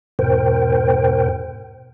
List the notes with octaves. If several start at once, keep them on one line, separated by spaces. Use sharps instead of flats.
E2 G#2 B2 A#4 C5 G5